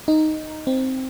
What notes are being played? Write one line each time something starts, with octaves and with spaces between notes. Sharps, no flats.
D#4
C4